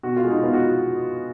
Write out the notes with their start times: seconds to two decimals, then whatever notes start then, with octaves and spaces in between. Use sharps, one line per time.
0.03 B2 F#4
0.16 F4
0.24 G#3
0.30 D#4
0.43 B3 F4
0.53 F#4